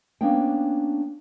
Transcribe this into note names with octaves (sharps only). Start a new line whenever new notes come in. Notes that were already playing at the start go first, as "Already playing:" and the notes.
A#3 B3 C#4 D4 G5